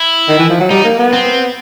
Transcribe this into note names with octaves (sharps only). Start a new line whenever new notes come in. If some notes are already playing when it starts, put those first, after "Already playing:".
Already playing: E4
D#3
E3
F3
F#3
G3 D#4
A#3
B3
C4